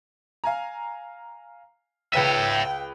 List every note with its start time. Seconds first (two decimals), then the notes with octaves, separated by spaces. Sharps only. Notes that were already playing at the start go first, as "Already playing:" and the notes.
0.44 F5 G#5 A#5
2.13 C#2 B4 C#5 E5 G5 D#7